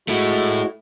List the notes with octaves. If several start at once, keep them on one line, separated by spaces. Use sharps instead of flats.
G#3 A3 E4 F#4